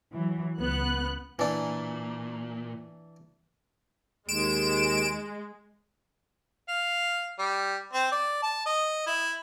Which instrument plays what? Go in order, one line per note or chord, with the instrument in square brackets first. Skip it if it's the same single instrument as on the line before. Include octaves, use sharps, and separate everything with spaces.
[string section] E3 F#3
C#2 B3 F#6
[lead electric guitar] A#2 [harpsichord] E3 D4
[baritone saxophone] D#2 [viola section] G#3 [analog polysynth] D7 E7
[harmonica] F5
G3
C4
D5
A5
D#5
E4